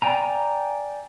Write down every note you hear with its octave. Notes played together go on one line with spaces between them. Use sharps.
D5 G5 G#5 A#5